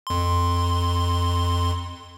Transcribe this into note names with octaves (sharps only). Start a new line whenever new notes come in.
F2 C6